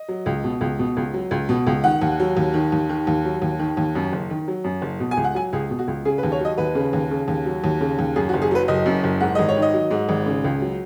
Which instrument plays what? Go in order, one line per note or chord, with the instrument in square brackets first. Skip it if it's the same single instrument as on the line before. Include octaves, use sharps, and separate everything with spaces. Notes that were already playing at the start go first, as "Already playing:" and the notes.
Already playing: [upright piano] D#5
F#3
C#2
B2
C#2
B2
C#2
F#3
C#2
B2
C#2
D#3 F#5
D#2
F#3
D#2
D#3
D#2
D#3
D#2
F#3
D#2
D#3
D#2
F#2
F#1
D#3
F#3
F#2
F#1
B2
G#5
C#2
F#5
F#3 G#5
C#2 G#4
B2
F#4
C#2
C#3 G#4
B4
D#2
C#5
F#3 D#5
D#2 B4
C#3
D#2
C#3
D#2
F#3
D#2
C#3
D#2
F#2 G#4
F#4
F#1
G#4
F#3 B4
F#1 D#5
F#2
F#1
G#2 F#5
G#1 D#5
C#5
D#3
D#5
F#3
G#2
G#1
C#3
C#2
F#3